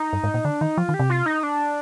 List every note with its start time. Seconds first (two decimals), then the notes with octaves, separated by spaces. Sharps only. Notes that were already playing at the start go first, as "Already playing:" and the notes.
Already playing: D#4
0.13 G2
0.24 G#2
0.34 A#2
0.45 D3 D4
0.61 D#3 D#4
0.77 F3 F4
0.89 D#3
0.94 G4
0.99 C3
1.10 F4
1.26 D#4
1.43 D4